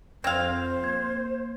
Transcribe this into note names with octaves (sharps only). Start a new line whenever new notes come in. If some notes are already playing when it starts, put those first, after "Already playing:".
F2 C4 C5 F5 G#6
A#3 G#6